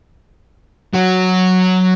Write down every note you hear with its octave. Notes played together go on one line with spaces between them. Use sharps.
F#3 F#4